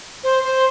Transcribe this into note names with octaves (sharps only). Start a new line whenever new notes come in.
C5
C5